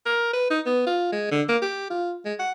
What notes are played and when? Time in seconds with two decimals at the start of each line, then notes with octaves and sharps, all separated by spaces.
0.06 A#4
0.33 B4
0.50 D#4
0.66 B3
0.87 F4
1.12 G#3
1.31 D3
1.49 A#3
1.62 G4
1.90 F4
2.25 G#3
2.39 F#5